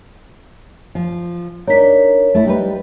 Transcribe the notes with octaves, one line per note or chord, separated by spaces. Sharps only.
F3
D4 D#4 A#4 C#5 B6
A3 E4
G3 D#4 B4